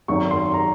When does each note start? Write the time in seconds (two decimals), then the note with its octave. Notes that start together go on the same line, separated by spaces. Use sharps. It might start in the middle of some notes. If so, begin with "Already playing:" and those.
0.08 G#1 F#2 D#3 C#6
0.31 C6
0.54 A#5